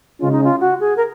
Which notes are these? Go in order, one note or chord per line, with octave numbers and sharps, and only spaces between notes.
C#3 G#3 C#4 F4
D#4
F4
F#4
G#4
A#4